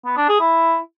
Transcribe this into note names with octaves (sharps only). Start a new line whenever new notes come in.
B3
D4
G#4
E4